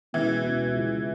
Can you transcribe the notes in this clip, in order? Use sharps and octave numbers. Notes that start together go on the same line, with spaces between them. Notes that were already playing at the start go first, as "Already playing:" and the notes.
B2 E3 G#3 C#4 F#4 B4
B2 G#3 C#4 F#4 B4
C#3 F3 G#3